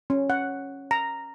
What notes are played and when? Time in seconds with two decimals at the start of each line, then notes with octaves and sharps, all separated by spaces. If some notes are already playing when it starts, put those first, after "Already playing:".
0.10 C#4
0.30 F#5
0.91 A#5